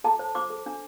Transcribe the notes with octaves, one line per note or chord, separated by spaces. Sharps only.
A4 A5
C5
C5 D6
A4
D4